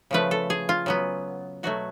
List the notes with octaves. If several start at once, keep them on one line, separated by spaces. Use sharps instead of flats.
C#3 F3 A3 B4
A4
G#4
F4
C#3 F#3 B3
B2 F#3 A3 F#4